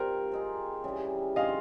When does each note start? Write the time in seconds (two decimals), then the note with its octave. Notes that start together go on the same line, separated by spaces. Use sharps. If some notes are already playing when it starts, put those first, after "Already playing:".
Already playing: G3 C4 F4 A#4 C5
0.32 C4 D#4 G#4
0.84 C#3 E3 G3
1.36 C4 F4 G#4 C#5 D#5 F5